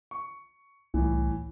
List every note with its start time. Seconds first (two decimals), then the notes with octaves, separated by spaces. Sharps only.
0.11 C#6
0.94 C2 A2 E3